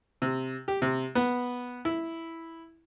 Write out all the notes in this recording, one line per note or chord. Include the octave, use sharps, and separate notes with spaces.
C3
G4
C3
B3
E4